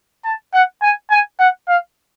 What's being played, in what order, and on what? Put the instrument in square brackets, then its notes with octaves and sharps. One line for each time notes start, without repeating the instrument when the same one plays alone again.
[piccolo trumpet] A5
F#5
G#5
G#5
F#5
F5